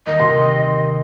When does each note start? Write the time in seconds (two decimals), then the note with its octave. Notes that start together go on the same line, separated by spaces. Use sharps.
0.06 D#2 A#4 D#5
0.20 C3 C6